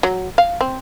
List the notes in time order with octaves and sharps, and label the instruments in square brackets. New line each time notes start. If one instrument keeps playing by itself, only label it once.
[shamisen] F#3
F5
C4